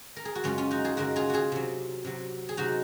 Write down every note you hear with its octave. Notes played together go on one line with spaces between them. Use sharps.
A#4
G#4
F#4
F#2 C#3 G#3 C#4 F4
C#4 F4
D#4 F#4
F4 G#4
F#2 C#3 G#3 F#4 A#4
F4 G#4
F4 F#4 G#4
C3 F#3
C3 F#3
G#4
C3 F#3 D#4 F#4